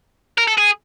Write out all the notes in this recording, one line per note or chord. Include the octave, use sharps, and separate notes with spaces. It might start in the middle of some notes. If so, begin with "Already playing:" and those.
A#4
A4
G#4